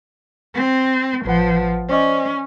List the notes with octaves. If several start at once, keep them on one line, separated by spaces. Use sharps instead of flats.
C4
A1 F3 B4 F#5
C#4 C5 D5 D#5